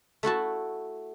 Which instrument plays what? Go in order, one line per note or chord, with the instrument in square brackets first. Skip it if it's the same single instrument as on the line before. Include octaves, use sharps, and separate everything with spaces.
[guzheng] A3 E4 F#4 A5